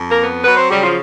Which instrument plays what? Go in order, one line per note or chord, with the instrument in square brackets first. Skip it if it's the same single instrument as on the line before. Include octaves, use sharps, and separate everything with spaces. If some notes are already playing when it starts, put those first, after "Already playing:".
Already playing: [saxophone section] F2
A#3 A#4
B3
F#3 B3 B4
C4 C5
C#3 G3 G4
F3 F4